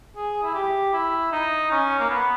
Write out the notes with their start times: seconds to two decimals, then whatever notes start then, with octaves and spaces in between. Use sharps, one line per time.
0.16 G#4
0.43 E4
0.54 G4
0.93 E4
1.32 D#4
1.71 C#4
1.99 A#3
2.10 B3